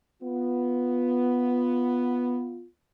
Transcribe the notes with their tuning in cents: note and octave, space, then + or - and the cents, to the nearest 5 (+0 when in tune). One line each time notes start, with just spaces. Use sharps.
B3 +0 F4 +5